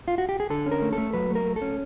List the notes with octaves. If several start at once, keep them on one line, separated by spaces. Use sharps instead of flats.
F4
F#4
G4
G#4
D3 A4
C#4
A#4
A3
A4
A3
F#3 B4
A3 A#4
A3
A4
C#4